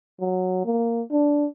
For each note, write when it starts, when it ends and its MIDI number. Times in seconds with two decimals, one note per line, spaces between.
0.20 0.60 54
0.65 1.02 58
1.11 1.46 62